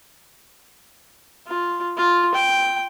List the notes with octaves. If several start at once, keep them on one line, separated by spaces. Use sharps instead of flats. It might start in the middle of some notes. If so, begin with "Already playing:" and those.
F4
F4
G5